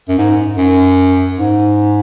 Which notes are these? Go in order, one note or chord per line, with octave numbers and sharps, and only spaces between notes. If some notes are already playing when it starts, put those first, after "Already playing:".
F#2
G#2
F#2
G#2